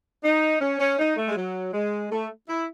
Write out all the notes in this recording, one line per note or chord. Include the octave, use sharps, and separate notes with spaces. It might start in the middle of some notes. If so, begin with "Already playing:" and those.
D#4
C#4
C#4
D#4
A3
G#3
F#3
G#3
A3
E4